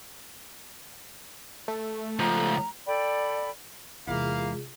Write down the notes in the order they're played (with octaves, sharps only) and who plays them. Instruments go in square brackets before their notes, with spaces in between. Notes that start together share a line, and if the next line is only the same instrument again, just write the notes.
[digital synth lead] A3
[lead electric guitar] C#2 F3 [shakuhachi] A#5
[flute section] A4 D5 G5 B5
[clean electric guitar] E2 E4 [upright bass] C3 G#3 [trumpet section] A#3 F5 [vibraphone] F4 G#4